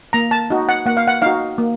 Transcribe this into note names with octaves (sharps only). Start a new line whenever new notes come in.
A#3 A#5
A5
D#4 F#4
F#5
A#3 F#5
F5
F#5
D#4 F#4 F5
A#3